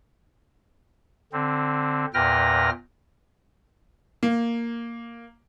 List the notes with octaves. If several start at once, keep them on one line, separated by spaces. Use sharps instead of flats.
D3 C4
E2 A#2 B4 G5 F6 A#6
A#3